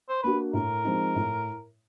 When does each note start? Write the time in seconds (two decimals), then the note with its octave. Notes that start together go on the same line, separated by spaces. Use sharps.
0.09 C5
0.23 A#3 D4 F#4 B4
0.53 A2 A#4
0.85 F3 G#3 C4 D#4
1.16 A2